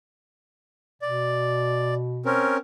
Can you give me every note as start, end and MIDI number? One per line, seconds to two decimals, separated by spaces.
1.02 2.48 47
1.02 1.94 74
2.25 2.57 60
2.25 2.57 61
2.25 2.57 70